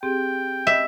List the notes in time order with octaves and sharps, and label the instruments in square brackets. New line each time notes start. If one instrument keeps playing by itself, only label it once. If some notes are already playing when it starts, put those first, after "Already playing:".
[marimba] C4 G4 G#4 [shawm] G5
[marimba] D#5 [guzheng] E5